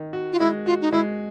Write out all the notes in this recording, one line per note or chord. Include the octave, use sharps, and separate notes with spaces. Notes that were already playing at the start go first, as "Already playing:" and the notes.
Already playing: D#3
F#4
F4
G#3 E4
F4 F#4
D#4
G#3 E4